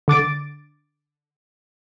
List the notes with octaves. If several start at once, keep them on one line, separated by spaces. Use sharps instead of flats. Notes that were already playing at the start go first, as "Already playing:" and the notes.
D3 D6 A6 D7